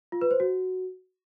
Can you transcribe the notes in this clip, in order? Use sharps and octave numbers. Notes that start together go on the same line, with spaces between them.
F4
B4
C5
F#4